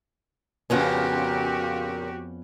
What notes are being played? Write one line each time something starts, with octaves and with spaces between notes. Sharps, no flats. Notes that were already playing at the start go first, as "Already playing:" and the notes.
F2 A#2 C#3 B3 C#4 F#4 G4